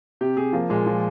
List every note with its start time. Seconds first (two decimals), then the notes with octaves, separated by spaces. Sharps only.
0.21 C3 G4
0.37 C3 G#4
0.53 F3 A#3
0.69 A#2 G#3
0.86 F3